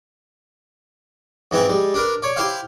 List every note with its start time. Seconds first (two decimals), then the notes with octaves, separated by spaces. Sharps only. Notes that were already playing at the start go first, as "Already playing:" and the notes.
1.51 G#2 E3 C4 E4 B4
1.68 G3 G#3
1.94 D4 A#4 B4
2.22 C#5 D5
2.36 E4 G4 C5 E5 F5